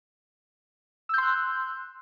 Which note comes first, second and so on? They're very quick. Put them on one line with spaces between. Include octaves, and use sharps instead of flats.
E6 G6 C6 F#6